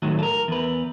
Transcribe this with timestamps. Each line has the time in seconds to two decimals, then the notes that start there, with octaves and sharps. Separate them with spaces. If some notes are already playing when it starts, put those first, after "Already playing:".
0.02 A2 D#3 F#3
0.19 A4 A#4
0.48 E2 B4